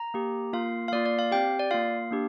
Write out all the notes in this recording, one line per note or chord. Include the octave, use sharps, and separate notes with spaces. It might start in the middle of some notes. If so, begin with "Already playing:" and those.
Already playing: A#5
A#3 G4
A#3 F4 F5
F5
A#3 F4 D5
D5
F5
C4 G4 G5
D5
A#3 F4 F5
A#3 D4 G4